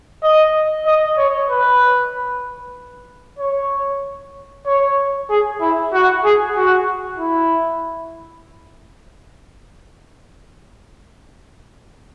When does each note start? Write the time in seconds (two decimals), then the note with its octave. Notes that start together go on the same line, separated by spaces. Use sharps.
0.23 D#5
0.86 D#5
1.18 C#5
1.49 B4
3.39 C#5
4.66 C#5
5.30 G#4
5.61 E4
5.93 F#4
6.25 G#4
6.57 F#4
7.19 E4